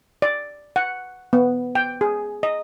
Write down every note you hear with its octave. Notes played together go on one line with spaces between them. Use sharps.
D5
F#5
B3
G5
G#4
D#5